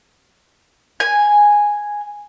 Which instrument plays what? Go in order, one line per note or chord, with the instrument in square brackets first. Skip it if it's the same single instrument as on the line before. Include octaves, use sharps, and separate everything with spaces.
[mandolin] G#5